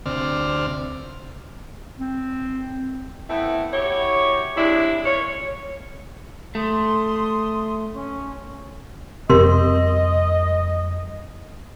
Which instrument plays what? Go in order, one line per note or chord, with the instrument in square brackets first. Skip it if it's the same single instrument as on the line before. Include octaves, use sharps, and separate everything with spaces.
[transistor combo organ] D2 C3 C4 D5 F6
[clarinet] C4
[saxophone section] A3 B3 C4 E4
E4 F#4 G4 C#5
C3 G#3 D4 E4
F4 A#4 C#5
[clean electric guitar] A3 [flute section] C6 D#6
[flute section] C#4
[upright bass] F2 G3 [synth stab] C3 [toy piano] A#4 C6 [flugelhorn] D#5